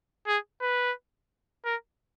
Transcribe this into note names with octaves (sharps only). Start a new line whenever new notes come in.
G#4
B4
A#4